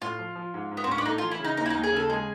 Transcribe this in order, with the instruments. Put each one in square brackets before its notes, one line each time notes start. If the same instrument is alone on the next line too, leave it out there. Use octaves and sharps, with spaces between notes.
[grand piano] A2 [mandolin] F4
[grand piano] F3
F3
G#2
G#2
[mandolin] B3
C4
[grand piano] A1 [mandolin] C#4
[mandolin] D4
[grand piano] A3 [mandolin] D#4
[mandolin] F4
[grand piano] E3
[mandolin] E4
[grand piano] C#3
[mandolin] D#4
[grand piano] D#2 [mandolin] D#4
[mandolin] E4
[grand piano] D#2 [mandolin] D#4
[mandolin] G#4
[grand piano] C#3 [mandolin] A4
[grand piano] G#3 [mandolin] G#4